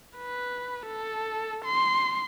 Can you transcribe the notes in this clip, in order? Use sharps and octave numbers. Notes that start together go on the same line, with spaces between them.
B4
A4
C6